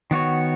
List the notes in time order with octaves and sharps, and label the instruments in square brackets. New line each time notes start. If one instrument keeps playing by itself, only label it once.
[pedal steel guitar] D#3 B3 F#4 C#5